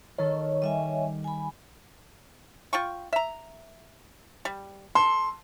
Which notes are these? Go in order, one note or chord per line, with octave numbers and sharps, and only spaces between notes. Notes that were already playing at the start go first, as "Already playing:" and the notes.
D#3 A4 C#5
G3 D#5 E5 G#5
G#5 B5
F4 G5 C#6
E5 A#5
G3
A4 C6